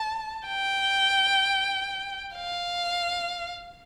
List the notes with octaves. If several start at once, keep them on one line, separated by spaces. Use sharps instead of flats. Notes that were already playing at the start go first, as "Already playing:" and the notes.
Already playing: A5
G5
F5